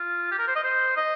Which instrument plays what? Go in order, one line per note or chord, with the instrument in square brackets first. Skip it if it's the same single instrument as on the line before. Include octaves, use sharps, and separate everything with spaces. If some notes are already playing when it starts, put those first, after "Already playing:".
Already playing: [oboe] F4
G4
A#4
C5
D#5
C5
D#5